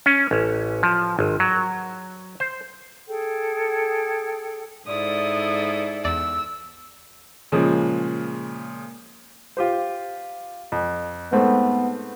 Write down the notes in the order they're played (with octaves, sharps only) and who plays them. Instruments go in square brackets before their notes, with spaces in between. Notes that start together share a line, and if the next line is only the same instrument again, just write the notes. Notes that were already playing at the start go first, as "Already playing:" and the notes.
[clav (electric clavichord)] C#4
A1
F3
G#1
F#3
C5
[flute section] G#4 A4 G5
[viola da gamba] G#2 E4 A4 [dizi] D5 [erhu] D#6
[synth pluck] E2 D5 [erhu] E6
[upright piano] A#2 C#3 F3 G#3
[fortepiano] F4 G4 C5
F2
[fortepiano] G#2 A3 C4 [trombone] B3